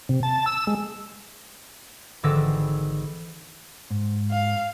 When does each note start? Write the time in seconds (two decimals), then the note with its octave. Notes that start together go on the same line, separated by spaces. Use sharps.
0.09 C3
0.23 A5
0.46 E6
0.67 G#3
2.23 G#1 D3 E3 D6 E6 A#6
3.90 G#2
4.31 F5